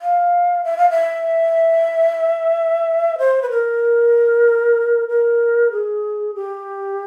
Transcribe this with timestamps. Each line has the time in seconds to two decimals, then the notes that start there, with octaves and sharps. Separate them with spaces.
0.01 F5
0.65 E5
0.78 F5
0.90 E5
3.18 C5
3.42 B4
3.50 A#4
5.09 A#4
5.72 G#4
6.35 G4